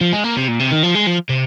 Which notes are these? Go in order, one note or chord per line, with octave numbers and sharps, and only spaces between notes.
F3
G#3
A#3
C3
A#2
C3
D#3
F3
G#3
F3
C3